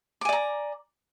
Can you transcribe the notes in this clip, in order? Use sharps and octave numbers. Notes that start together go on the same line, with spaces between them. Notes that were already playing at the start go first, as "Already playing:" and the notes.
D5 G#5 A#5 D6